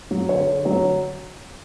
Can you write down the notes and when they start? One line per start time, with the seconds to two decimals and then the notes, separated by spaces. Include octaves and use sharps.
0.11 F#3
0.29 D3 C#5
0.47 D3
0.65 F#3 C#5